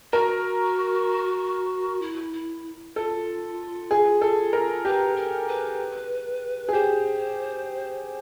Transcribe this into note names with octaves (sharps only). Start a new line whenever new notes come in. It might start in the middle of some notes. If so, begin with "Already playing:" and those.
F#4 A#4
E4
E4
F4 A4
G#4
A4
A#4
G4 B4
A#4
B4
G#4
G4 C5